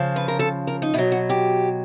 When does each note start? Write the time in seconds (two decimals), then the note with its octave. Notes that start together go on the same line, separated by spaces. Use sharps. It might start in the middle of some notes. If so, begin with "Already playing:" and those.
Already playing: C#3 F3
0.16 B4
0.28 A#4
0.39 A4
0.67 A#4
0.82 D#4
0.94 B2 E4
0.98 F#3
1.12 F#4
1.30 G4